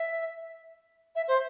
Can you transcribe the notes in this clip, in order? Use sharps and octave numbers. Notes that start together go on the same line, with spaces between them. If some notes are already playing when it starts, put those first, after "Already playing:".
Already playing: E5
E5
C5